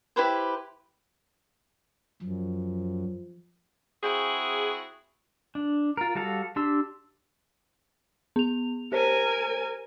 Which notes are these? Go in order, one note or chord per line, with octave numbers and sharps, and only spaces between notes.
E4 G4 B4 C5
F#2 F3
C4 E4 F#4 G#4
D4
F4 A#4
G3 F#4 A4 F5
D4 G4 C6 E6
B3 F7
G4 A#4 C5 C#5 G#5